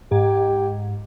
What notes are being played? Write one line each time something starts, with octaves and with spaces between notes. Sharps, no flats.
G#2 G4